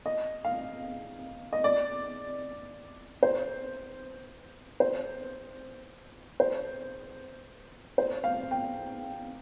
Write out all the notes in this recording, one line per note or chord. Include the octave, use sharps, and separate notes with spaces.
D#5
F5
D#5
D5
C5
C5
C5
C5
F5
G5